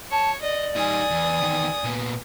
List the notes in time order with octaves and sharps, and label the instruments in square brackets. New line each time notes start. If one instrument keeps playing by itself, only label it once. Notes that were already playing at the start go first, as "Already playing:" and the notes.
[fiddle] C#5 [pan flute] A5
[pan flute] D5 [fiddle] D#5
[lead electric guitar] G3 D#4 [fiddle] G#5 D#6
[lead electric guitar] E2
E2 D#3
A#2 B3